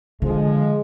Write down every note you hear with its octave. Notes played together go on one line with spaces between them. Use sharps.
D3 F3 G#3